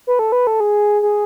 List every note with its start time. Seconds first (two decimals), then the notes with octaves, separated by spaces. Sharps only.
0.07 B4
0.19 A4
0.32 B4
0.47 A4
0.60 G#4
1.02 G#4